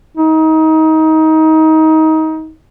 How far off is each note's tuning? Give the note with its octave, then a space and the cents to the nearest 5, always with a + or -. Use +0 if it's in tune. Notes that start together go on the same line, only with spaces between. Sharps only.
D#4 +25